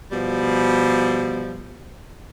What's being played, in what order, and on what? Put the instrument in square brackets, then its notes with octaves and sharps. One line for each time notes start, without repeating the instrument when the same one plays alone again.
[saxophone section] B2 F3 G3